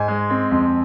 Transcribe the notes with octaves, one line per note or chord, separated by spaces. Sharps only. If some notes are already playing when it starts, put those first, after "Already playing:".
Already playing: G#2 G#5
G#3
C4
F2